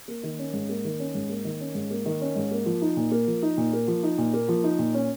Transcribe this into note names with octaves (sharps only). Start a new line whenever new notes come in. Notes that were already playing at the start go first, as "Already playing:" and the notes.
A#3
D#3
C#4
G#2
A#3
D#3
C#4
G#2
A#3
D#3
C#4
G#2
A#3
D#3
C#4
G#2
A#3
F3
D#4
A#2
A#3
F3
D#4
A#2
A#3
F3
D#4
A#2
A#3
F3
D#4
A#2
C#4